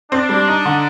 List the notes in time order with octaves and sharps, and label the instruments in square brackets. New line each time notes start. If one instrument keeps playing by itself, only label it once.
[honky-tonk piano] C4 [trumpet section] D4
[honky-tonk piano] G3
D#4
D3